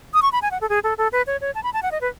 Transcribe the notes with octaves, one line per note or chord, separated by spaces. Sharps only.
D#6
C#6
B5
G#5
F#5
A4
G#4
A4
A4
B4
C#5
C#5
A5
B5
A5
F#5
D#5
B4